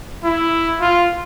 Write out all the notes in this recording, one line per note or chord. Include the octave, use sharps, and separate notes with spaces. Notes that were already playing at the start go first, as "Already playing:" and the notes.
E4
F4